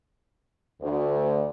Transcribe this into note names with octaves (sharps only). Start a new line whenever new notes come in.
D2